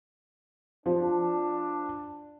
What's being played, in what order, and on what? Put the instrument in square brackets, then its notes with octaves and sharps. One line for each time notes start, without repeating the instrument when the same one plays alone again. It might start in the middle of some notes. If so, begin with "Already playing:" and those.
[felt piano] F3 [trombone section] D4